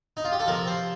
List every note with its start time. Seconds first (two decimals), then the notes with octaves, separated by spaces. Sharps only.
0.17 D#4
0.24 F4
0.32 G4
0.40 A4
0.47 C3 F3 A#4
0.67 C5